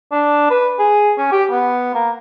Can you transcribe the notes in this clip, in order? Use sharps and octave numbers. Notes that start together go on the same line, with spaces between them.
D4
B4
G#4
C#4
G4
B3
A#3